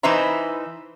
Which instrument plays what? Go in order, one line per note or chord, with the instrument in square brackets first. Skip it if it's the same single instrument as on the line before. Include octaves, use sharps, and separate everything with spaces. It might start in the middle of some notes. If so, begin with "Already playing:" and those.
[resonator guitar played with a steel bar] E3 D#4 B4 C5 E5 A#5